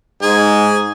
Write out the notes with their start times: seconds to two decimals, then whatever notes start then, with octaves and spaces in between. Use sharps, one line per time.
0.22 G#2 G#4